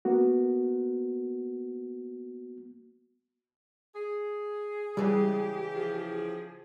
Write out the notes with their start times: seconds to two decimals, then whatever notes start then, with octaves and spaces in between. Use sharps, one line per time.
0.05 A#3 B3 F#4
3.95 G#4
4.97 C#3 E3 G3 G#3 G4
5.73 F3 G#4